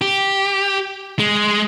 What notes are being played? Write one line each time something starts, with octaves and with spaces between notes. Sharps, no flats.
G4
G#3